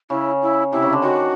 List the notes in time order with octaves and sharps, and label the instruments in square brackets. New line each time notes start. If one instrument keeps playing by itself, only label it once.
[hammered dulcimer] C#3 [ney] E4
[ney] E4
[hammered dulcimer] C3 [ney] E4
[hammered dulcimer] C#3
D3
[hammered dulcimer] D#3 [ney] F#4